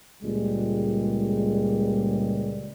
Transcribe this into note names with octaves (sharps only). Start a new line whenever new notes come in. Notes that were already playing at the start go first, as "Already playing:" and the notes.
C#2 A#2 G3 G#3